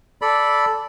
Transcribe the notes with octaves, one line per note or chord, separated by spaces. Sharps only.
A4 D5 B5